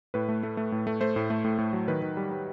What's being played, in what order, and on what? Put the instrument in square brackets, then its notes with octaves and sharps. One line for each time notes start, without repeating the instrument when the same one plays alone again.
[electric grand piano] A2 B4
A3
A3
A3
A2
A3
A3 C5
A2
A3
A2
A2
F#3
D#3 B4
D#3
G3
G3